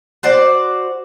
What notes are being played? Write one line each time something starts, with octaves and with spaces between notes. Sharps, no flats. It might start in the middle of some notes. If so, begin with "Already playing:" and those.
F#4 C5 D5